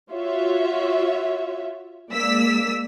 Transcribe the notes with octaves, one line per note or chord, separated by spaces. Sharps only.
F4 F#4 C#5 E5
G#3 A#3 D5 E6 B6